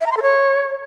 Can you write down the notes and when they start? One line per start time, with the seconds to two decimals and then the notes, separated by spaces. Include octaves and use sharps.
0.01 E5
0.06 A#5
0.12 C6
0.17 A4
0.22 C#5